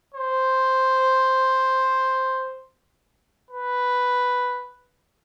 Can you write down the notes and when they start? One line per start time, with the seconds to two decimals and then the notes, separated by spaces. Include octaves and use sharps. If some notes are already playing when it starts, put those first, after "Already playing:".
0.14 C5
3.51 B4